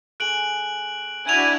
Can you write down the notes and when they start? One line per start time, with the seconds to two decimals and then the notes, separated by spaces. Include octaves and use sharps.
0.20 A3 G#4 F#6 D7 F#7
1.27 D4 E4 F#4 G#5 G#6 D#7 F7